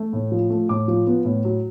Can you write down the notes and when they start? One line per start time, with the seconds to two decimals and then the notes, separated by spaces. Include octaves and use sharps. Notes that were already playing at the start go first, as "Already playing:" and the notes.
Already playing: A3
0.13 A2
0.32 F3
0.50 A3
0.69 A2 D6
0.88 F3
1.07 B3
1.25 A2
1.45 F#3